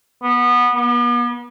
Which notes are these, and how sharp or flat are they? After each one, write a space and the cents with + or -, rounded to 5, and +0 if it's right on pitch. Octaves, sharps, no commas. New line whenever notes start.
B3 -15
B3 -40